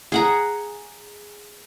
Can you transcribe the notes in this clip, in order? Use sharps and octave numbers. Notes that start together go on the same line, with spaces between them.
G#4 F#5 A#5